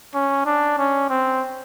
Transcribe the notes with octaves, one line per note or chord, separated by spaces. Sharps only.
C#4
D4
C#4
C4